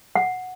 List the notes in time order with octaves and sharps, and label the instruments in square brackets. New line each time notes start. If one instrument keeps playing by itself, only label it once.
[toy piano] F#5